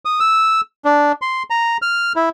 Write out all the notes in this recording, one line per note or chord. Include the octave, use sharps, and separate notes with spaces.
D#6
E6
D4
C6
A#5
F6
E4